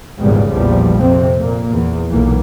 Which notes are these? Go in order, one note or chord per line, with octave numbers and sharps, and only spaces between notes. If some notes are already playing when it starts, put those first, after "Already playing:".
G#1 E2 A#2 C#3 G3 G#3
A#1 E2 A2 F3 G3
F2 C3 C4
A#2 A#3
E2
B1 A#2 E3 A#3